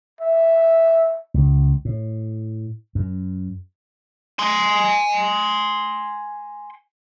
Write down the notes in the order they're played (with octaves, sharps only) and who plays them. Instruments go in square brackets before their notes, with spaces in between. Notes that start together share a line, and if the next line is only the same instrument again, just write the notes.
[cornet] E5
[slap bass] C#2
A2
F#2
[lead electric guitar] G#5 C6